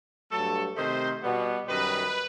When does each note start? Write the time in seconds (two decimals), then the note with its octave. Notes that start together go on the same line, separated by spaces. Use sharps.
0.31 G2 F#3 A3 A4
0.76 C3 D#3 A3 C5
1.22 B2 G3 B3
1.67 F#2 D#3 G3 B4